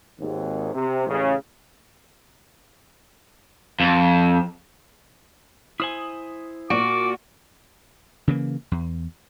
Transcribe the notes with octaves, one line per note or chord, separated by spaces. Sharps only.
G#1 D#2 G#2
C3
A1 C#3
F2
E4 C5 G#5 D#6 F#7
A#2 F#4 D5 D6 D7
C#3 E3 A#3
E2